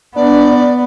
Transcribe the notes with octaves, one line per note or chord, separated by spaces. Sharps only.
B3 D4 D5